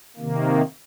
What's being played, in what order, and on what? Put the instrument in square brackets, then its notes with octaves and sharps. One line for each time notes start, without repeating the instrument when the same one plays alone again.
[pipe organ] C3 D#3 A#3